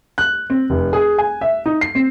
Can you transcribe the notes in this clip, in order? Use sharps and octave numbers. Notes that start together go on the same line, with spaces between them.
F#6
C4
F1
G#4
G#5
E5
D#4
C7
C4